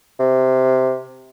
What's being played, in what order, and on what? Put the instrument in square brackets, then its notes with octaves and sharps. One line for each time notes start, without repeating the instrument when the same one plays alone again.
[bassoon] C3